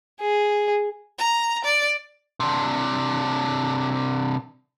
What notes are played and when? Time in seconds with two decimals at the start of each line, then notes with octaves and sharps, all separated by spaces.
0.20 G#4
1.19 A#5
1.65 D5
2.40 C3 D4